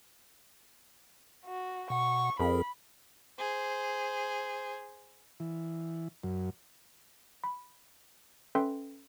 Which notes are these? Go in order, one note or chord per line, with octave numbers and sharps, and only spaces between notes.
F#4
B2 F#5 C#6
F2 C4 G#4 A#4 B5
G#4 C5
E3
F#2
B5
C#4 A4 B4 E5 G5 C6